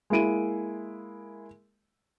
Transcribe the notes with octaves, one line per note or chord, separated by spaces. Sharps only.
G#3 A#3 E4 D7 D#7